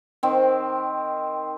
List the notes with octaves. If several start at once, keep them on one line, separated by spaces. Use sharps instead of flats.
D#3 C4